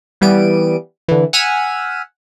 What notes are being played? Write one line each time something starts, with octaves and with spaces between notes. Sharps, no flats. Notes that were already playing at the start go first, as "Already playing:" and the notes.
E3 G3 B3 D7 D#7
D3 E3
F#5 G#5 E6 F6 B6 D#7